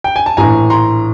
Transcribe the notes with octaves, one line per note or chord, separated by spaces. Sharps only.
G5
G#5
A5
A#1 A2 E3 G#5 A#5
A#5 C6